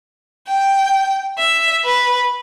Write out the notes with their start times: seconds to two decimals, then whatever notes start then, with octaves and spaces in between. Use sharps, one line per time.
0.48 G5
1.39 E5
1.85 B4